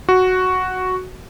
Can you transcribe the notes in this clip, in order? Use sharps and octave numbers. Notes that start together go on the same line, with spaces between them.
F#4